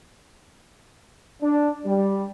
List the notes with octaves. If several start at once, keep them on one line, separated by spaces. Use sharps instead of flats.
D4
G3